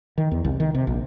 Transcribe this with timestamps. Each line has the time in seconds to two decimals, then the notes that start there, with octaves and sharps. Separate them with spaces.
0.18 D#3
0.31 E2
0.44 C2
0.60 D#3
0.75 C3
0.87 A#1